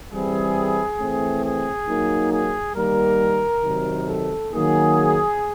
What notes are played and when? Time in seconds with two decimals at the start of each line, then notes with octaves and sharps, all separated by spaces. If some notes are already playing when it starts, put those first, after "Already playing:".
0.12 E3 G3 C4 E4 G#4
0.99 E3 A3 C4
1.44 G#4
1.87 F#3 A#3 D#4
2.32 G#4
2.75 D#3 G3 A#3 A#4
3.63 C3 D#3 F#3
4.08 A4
4.51 D#3 F#3 A#3 D#4 G#4